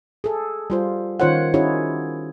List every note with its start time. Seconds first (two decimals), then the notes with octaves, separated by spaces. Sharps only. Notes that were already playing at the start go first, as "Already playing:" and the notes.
0.24 G#4 A4
0.70 G3 F4 C5
1.20 D#3 C#4 F4 C5 C#5 F#5
1.54 C#4 D#4 E4 F#4 G#4 C#5